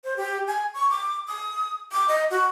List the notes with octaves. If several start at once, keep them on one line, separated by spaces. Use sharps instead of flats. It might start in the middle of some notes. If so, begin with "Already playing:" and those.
C5
G4
G#5
C#6
D6
D#6
D6
D#5
F#4